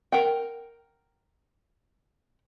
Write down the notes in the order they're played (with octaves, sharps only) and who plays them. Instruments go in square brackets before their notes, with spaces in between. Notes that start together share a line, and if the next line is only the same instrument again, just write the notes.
[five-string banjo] A#4 F#5 G5